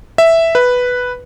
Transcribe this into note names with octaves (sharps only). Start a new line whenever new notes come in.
E5
B4